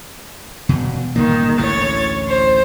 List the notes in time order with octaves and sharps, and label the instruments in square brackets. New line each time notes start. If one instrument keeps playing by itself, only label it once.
[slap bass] E1 B2
[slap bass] G1 A#2 A#3 [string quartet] D#3
[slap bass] A1 D2 E3 [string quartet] C#5 A6
[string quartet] C5